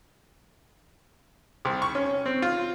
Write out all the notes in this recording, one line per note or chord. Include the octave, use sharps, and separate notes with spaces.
C2
C#6
C#4
C4
F4